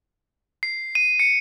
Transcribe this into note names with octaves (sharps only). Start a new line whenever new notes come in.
C7
D#7
C#7